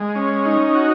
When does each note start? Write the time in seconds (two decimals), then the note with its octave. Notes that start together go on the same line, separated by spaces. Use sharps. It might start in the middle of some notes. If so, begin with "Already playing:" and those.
Already playing: G#3
0.15 C#4
0.45 D#4
0.75 F#4